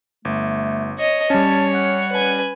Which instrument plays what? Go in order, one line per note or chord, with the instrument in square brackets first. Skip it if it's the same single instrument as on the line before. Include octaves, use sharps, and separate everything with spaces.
[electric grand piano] G1 [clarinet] A3
[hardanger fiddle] C#5 D#5
[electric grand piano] G3 C#4 [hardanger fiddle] C#5 [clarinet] A5
[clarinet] F#5
[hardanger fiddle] B4 G#5